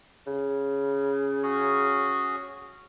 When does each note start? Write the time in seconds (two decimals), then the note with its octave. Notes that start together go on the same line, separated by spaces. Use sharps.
0.27 C#3
1.43 C#4 F#4 G#4